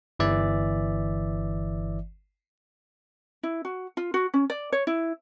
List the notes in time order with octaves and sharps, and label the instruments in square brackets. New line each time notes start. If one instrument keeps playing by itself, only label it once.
[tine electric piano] G1 E3 D5 E5
[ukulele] E4
F#4
F4
F#4
C#4
D5
C#5
E4